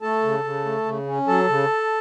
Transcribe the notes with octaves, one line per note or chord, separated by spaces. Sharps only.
A3 A4 A5
C#3
C#3
A3
C#3
C#4
F#3 A4 A5
C#3